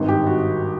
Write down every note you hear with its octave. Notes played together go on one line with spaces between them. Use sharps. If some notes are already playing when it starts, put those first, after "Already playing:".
Already playing: G#1 G2 D#3
G4
F#4